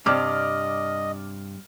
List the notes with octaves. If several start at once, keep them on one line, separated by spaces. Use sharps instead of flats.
G2 C3 D5 D#5 D6 F6